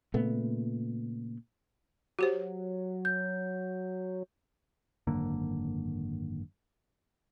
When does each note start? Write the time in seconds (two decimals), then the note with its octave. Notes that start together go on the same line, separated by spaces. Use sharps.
0.14 A#2 C#3 A3 B3
2.19 F#3 F#4 G4 C5
3.05 G6
5.07 G#1 F#2 D3 A#3